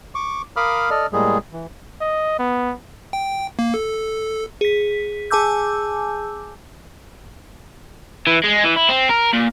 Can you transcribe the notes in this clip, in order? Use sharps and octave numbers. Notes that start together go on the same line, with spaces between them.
C#6 D6
A#4 F5 B5 D6 D#6 F6
A4 D5 D#5 F6
A2 G3 G#3 A#3 G#4
E3
D#5
B3
G5
A#3
A4
G#4 B6
G#4 G#5 A5 D6 E6 G6
E3
G#3
E3
E4
C4
A#4
A#2